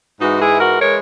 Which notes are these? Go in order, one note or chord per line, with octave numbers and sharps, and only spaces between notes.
G#2 E3 G#3 D#4 F#4
E4 G#4
F#4 A#4
E3 G#3 A#4 C#5